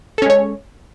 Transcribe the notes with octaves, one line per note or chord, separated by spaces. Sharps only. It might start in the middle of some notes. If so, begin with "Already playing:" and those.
G#3 C#4 A4 C#5